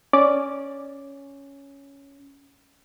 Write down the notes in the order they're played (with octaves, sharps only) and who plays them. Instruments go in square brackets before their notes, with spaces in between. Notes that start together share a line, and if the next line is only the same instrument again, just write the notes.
[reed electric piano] C#4 [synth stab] D5